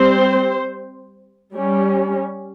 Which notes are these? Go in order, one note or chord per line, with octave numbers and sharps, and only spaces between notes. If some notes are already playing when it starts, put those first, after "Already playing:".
Already playing: G3 C4 C5
G3 C#4